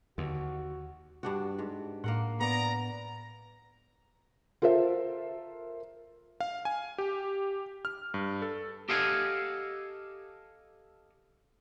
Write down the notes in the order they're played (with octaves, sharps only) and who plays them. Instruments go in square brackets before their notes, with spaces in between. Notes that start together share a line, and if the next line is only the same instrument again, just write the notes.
[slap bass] D#2 [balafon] D3 [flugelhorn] F#4
[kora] G2 D4 F#4
G#2
[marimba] A2 [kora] A#3 A#4 F#5
[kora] B3 [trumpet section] D5 A#5
[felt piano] F4 A4 A#4 C5 E5
[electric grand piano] F5
G#5
G4
F6
G2
A4
[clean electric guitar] G4 A4 D#5 F5 F#5 G#5